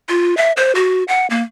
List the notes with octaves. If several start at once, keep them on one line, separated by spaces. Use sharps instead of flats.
F4
E5
C5
F#4
F#5
A#3